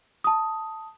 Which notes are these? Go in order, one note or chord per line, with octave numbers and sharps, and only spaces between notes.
A5 D#6